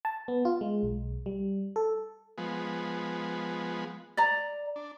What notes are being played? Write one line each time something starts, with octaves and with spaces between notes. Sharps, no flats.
A5
B3
F4
G#3
B1
G3
A4
F3 G#3 B3
D5 A#5
D4